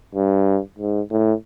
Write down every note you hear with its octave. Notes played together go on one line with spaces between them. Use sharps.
G2
G#2
A2